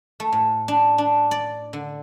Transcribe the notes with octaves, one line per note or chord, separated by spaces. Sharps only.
A3
A2
D4
D4
D5
D3